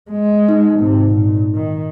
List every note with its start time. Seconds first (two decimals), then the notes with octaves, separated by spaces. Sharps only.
0.11 G#3
0.48 D#4
0.79 G#1 C3
1.13 A#2
1.55 D#3